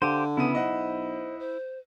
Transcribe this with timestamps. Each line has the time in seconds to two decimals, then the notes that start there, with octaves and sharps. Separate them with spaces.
0.02 D3 G4 C5 F5 D#7
0.37 C#3 B3 E4 D#6 D#7
0.55 B1 C5 D#5 F#5
1.39 C5